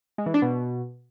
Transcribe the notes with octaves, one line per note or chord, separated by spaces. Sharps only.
G#3
E3
D4
B2